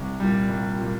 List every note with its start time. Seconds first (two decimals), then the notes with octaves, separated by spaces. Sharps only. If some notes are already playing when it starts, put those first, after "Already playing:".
Already playing: C2
0.20 A#2 G3
0.49 C2
0.78 A#2 G3